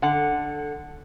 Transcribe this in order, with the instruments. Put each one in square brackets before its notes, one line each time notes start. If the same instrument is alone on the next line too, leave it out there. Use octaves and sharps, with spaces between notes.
[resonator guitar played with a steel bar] D3 F#5